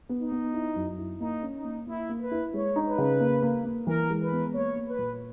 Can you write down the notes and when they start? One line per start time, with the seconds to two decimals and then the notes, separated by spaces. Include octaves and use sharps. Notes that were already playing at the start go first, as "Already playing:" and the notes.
0.09 B3
0.20 D#4
0.32 B3
0.54 E4
0.76 F#2
0.98 E4
1.20 A#3 D#4
1.43 C#4
1.54 D#4
1.65 A#3
1.87 A#3 E4
2.09 A#3
2.21 B4
2.31 E4
2.54 G#3 C#5
2.76 D#4
2.88 B4
2.98 C#3
3.20 A#3
3.42 A#3
3.65 A#3
3.87 E3 A#4
4.10 G#3
4.21 B4
4.32 B3
4.54 A#3 C#5
4.76 A#3
4.87 B4
4.98 A#2